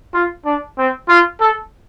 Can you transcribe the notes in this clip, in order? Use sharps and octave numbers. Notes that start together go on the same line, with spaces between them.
F4
D4
C4
F4
A4